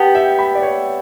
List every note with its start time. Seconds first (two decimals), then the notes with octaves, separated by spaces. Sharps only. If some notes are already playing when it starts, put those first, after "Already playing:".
Already playing: B3 G4 F#5 G5 A5
0.15 E5 G5
0.38 G5 B5
0.55 D5
0.62 C#5